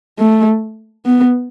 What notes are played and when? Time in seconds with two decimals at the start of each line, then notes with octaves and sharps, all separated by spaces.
0.19 A3
1.06 B3